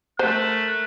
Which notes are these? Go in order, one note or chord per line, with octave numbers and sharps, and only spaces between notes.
A3 A#4 C5 F#6